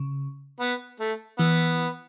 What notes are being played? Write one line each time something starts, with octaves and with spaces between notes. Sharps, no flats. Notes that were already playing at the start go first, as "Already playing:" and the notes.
Already playing: C#3
B3
A3
E3 B3